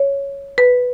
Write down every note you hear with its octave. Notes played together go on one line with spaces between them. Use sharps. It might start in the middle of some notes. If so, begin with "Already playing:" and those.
Already playing: C#5
B4